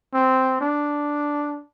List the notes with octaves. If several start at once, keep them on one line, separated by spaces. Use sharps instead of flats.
C4
D4